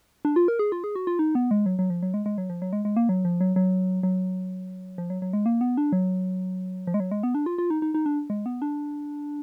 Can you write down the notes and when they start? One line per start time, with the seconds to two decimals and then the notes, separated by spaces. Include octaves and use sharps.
0.25 D4
0.36 F4
0.48 A#4
0.59 G#4
0.72 F4
0.84 G#4
0.96 F#4
1.07 F4
1.19 D#4
1.35 B3
1.51 G#3
1.66 F#3
1.79 F#3
1.90 F3
2.03 F#3
2.14 G#3
2.26 G#3
2.38 F#3
2.50 F3
2.62 F#3
2.73 G#3
2.85 G#3
2.96 A#3
3.09 F#3
3.25 F3
3.41 F#3
3.56 F#3
4.03 F#3
4.98 F3
5.10 F#3
5.22 F#3
5.33 G#3
5.46 A#3
5.61 B3
5.77 D4
5.93 F#3
6.87 F3
6.94 G#3
7.00 F#3
7.11 G#3
7.23 B3
7.35 D4
7.46 F4
7.58 F4
7.70 D#4
7.82 D#4
7.94 D#4
8.06 D4
8.30 G#3
8.46 B3
8.62 D4